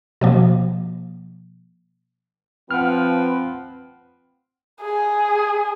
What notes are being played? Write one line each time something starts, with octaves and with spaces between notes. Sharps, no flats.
B2 F3 A#3
F3 C4 B4 F#5 F6
G#4